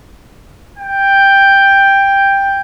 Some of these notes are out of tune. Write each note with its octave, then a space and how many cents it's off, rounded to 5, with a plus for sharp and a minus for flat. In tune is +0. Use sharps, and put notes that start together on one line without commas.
G5 +5